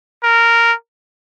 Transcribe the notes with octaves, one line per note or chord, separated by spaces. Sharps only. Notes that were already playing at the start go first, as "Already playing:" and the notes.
A#4